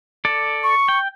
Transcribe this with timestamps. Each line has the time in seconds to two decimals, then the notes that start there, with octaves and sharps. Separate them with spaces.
0.25 A4 D5
0.63 C#6
0.88 G5